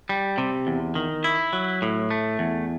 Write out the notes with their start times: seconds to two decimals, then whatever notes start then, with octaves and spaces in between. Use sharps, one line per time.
0.09 G3
0.38 C3
0.67 E2
0.95 D#3
1.24 E4
1.53 F#3
1.82 A2
2.11 A3
2.39 E2